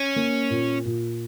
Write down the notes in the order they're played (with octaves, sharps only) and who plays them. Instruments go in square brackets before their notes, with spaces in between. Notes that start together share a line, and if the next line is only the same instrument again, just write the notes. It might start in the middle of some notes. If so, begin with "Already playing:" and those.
Already playing: [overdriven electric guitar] C#4
[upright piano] A#3
A#2
A#2